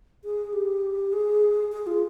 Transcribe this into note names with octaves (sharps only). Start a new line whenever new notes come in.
G#4
G4
G#4
G#4
F4